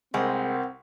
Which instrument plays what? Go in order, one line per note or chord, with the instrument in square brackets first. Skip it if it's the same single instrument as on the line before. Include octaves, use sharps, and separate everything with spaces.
[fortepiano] C2 [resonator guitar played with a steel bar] G#3 [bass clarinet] C4 [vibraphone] A#4 F#5